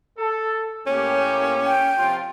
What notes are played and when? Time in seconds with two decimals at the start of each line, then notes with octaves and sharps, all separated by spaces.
0.18 A4
0.87 A2 A#3 C#4 G4
1.64 G5
1.99 C3 F3 F4